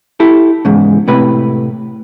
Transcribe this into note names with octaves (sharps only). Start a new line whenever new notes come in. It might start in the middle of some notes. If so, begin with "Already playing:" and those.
E4 G4 A4
E2 G#2 C#3
A2 C3 B4 B5